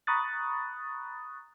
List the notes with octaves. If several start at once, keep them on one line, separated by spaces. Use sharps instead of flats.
A#5 B5 C#6 D#6 F#6 A6